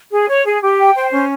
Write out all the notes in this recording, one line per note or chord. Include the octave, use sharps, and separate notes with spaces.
G#4
C#5
G#4
G4
G5
C5
C#4